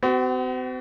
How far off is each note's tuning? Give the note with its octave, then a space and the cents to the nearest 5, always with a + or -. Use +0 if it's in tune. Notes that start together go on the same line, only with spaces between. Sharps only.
C4 -40 F#4 +35